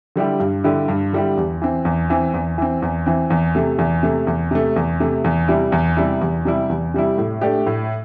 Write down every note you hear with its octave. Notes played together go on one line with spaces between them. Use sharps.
D3 G3 E4 G4
G2
D3 G3 E4 G4
G2
D3 G3 E4 G4
E2
E3 C4
E2
E3 C4
E2
E3 C4
E2
E3 C4
E2
C3 A3
E2
C3 A3
E2
C3 A3
E2
C3 A3
E2
C3 G3 E4
E2
C3 G3 E4
E2
C3 G3 E4
E2
C3 G3 E4
A2
A3 D4 G4
A2